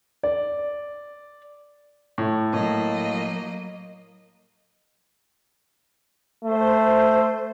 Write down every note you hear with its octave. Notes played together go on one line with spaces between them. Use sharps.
D5
A2
A2 F#3 A#3 D#5
A3 C5